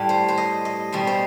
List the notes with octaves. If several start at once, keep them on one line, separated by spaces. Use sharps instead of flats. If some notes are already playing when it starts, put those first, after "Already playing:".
Already playing: A2 G3
C5
C5
D#5
D#5
B2 G3 C5
C5